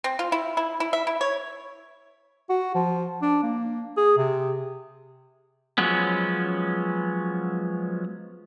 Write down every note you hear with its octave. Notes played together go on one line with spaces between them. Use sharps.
C4
F4
E4
E4
E4
E5
E4
C#5
F#4
F3
D4
A#3
G#4
C3
F3 F#3 G#3 B3 C#4